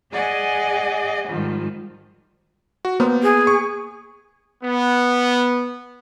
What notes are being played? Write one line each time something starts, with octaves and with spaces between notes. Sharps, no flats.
G#4 D5 D#5 F#5 G#5
G#2 D#3 F3 G3
F#4
A#3 B3 C5
G#4
C#6
B3